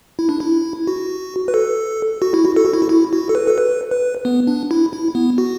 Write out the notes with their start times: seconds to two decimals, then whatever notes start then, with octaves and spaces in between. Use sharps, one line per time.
0.19 E4
0.29 D4
0.40 E4
0.87 F#4
1.48 B4
1.54 A4
2.22 F#4
2.34 E4
2.45 F#4
2.56 A4
2.65 F#4
2.73 E4
2.82 F#4
2.89 E4
3.13 F#4
3.29 A4
3.35 B4
3.47 A4
3.58 B4
3.91 B4
4.25 B3
4.47 D4
4.71 E4
4.93 E4
5.15 B3
5.38 F#4